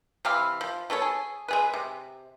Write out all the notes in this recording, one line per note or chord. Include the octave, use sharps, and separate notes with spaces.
C3 E3 F5 B5
F3
F#3 B3 A4 C#5
G#4
G#3 G#4 B4
C3